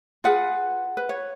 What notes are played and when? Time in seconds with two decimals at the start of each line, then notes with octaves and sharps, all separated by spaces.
0.24 F4 G#4 B4 F#5
0.97 B4
1.09 C#5